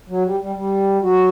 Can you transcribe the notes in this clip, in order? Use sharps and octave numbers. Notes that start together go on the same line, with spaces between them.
F#3
G3
G3
G3
F#3 F#4